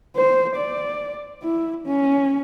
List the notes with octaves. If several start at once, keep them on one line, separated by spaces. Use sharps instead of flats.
C5
D5
E4
C#4